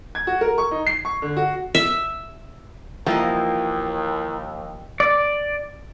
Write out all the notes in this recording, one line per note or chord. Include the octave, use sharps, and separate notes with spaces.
G#6
F#4
A#4
C#6
D#4
C7
C#6
D3
F#4
E5
D#2 E3 F3 A#3 D#4 D#5 G5
D5